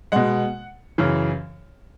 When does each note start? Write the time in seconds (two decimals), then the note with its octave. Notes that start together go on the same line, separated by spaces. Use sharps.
0.12 B2 G#3 F#5
0.98 F#2 C#3 E3